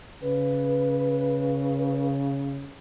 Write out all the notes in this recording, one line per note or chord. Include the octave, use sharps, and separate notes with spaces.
C#3 B4